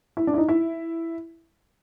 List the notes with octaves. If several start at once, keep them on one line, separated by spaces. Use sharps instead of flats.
E4
D4
E4
D#4
E4